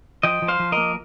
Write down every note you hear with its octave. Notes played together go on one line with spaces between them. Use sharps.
F3 D#5 G5
F3
C5 F5
F3
A#3 A#4 D#5